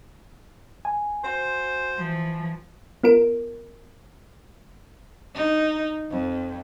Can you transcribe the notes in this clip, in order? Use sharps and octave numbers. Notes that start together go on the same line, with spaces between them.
G#5
F#4 C5
E3 F3
B3 F4 A#4 D7
D#4
F2